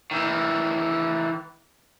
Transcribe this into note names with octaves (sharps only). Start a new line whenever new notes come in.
D#3 E3